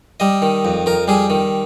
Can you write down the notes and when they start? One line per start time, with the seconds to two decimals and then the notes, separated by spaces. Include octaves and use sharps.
0.20 G3 D#5
0.42 D#3
0.65 F2
0.86 F2 A#4
1.08 G3 G#4
1.30 D#3